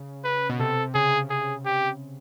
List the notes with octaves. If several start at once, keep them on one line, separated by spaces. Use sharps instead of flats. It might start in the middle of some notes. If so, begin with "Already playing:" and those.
Already playing: C#3
B4
B2
C3 A4
C#3 G#4
G#4
G4